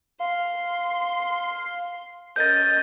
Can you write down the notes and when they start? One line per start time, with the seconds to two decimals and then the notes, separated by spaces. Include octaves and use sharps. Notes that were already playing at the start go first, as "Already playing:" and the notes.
0.20 F5 C6
2.36 C#4 A#4 D#5 G6 A6